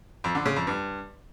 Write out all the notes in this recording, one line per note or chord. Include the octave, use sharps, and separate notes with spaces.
F2
D3
C#3
F2
G2